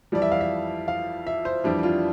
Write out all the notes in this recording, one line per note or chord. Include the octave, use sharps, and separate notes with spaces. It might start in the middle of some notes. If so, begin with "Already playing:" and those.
F2 E3 G3 D5
E5
F5
E5
F5
E5
C5
F2 E3 G3 D4
F4